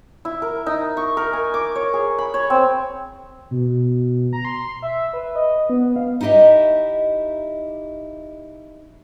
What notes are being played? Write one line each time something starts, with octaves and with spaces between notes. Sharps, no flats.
E4
A#4
D#4
C#6
A#4
G#5
D6
C#5
G#4
B5
C#5
C4
B2
A#5
C6
E5
B4
D#5
B3
F5
D#4 E4 G4 D#5 E5